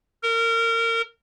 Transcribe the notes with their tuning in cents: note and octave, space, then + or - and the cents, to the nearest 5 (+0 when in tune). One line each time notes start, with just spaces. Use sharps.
A#4 -25